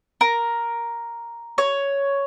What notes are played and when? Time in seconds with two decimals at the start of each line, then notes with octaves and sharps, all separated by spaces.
0.21 A#4
1.58 C#5